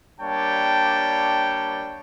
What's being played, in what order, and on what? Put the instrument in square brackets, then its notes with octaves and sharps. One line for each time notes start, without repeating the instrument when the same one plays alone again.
[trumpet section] G3 A#3 D4 C#5 G5 A5